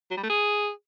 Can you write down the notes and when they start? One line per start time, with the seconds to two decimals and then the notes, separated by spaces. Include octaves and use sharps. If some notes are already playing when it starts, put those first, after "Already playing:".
0.11 F#3
0.17 G3
0.23 A3
0.30 G#4